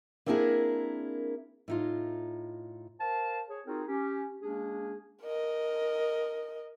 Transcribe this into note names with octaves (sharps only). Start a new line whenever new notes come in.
A#3 C4 D4 E4 G#4 A#4
A2 D#4 F4
A#4 C5 F5 A5
G#4 C#5
C4 D#4 F4 F#4 G#4 A#4
C#4 G4
G#3 A#3 C#4 D4 G#4
A#4 D#5